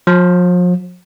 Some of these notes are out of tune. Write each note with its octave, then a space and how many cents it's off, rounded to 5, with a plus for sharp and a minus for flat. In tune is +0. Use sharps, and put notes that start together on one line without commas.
F3 +40